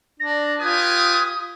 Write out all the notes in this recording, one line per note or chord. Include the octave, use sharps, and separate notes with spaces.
D4 A#6
F4 G4 B4 G#5 D#6